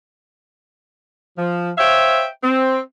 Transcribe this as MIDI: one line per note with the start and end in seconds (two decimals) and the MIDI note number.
1.37 1.70 53
1.77 2.27 72
1.77 2.27 73
1.77 2.27 76
1.77 2.27 77
1.77 2.27 79
2.42 2.80 60